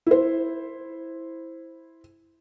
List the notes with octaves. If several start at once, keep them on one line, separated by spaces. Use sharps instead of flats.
E4 C5